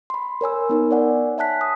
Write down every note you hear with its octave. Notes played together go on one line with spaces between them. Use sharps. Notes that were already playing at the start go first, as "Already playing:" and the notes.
B5 C6
A#4 C#5 G#5 E6
B3 D#4 A#4
C#5 D5 F#5 G#5
E5 G#5 A5 F#6 B6
D#6